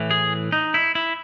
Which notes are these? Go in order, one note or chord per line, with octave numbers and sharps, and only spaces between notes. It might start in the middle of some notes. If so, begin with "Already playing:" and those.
Already playing: A2 E3
G#4
D#4
E4
E4